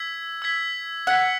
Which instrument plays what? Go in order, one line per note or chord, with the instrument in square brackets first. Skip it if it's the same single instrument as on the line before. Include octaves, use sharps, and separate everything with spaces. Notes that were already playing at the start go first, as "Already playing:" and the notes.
Already playing: [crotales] E6 G#6 B6
E6 G#6 B6
[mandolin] F#5 [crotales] E6 G#6 B6